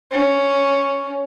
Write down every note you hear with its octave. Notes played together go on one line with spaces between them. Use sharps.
C#4